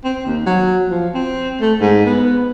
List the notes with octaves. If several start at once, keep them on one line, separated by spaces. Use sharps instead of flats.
C4
D#2
F#3
F3
C4
A3
G#2
B3